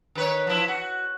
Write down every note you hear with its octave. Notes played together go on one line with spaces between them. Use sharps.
D#3 B4 C#5
F3 E4
F#4